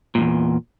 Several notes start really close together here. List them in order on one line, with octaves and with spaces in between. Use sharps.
A#2 G2 E2